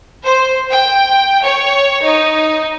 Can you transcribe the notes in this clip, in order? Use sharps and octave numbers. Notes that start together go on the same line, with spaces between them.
C5
G5
C#5
D#4